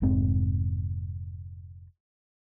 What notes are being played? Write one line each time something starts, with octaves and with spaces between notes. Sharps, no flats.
F1 G#2 C4